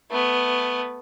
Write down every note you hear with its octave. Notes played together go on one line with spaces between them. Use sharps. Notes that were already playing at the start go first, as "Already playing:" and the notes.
A3 B3